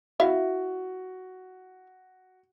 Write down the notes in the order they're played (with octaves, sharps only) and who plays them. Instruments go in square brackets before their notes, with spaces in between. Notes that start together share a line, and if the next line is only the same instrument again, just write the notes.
[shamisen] E4 E5 F5 [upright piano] F#4